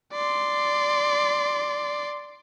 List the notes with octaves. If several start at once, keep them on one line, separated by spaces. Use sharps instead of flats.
D5 C6